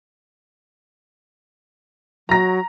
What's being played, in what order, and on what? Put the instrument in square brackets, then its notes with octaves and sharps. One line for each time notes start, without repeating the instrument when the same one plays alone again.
[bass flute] F#3 [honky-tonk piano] A#5 A#6